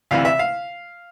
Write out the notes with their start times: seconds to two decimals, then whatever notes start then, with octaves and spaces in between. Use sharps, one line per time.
0.11 D2 C3 E3 F5
0.25 E5
0.39 F5